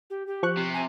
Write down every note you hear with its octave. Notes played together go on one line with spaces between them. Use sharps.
G4
G4
F3 C#6 F#6
C3
G#5